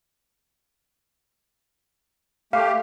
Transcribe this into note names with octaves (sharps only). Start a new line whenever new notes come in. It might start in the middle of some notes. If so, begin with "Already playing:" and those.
A3 G4 F5